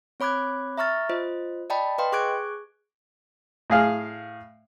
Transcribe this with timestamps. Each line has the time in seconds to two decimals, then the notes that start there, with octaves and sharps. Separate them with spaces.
0.20 C4 C#5 B5 D6 F#6 G#6
0.78 E5 A#5 C#6 F6 A6
1.09 F4 C5 D#5
1.70 D5 D#5 G5 A5 B5
1.98 B4 D#5 F5 G5 C6
2.12 G#4 C#6 D6 F#6 G#6 D7
3.70 A2 G#4 F5 F6